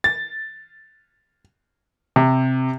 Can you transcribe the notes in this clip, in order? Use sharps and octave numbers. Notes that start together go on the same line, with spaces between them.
A6
C3